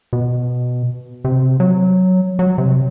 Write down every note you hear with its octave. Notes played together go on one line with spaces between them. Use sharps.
B2
C3
F#3
F#3
C3